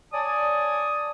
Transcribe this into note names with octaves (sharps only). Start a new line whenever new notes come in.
C#5 D5 G#5 A5 D#6